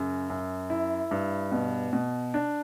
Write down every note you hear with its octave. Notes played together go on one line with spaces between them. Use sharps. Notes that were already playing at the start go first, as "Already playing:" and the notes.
Already playing: F#2 C#3
F#2
E4
G2
B2
B2
D4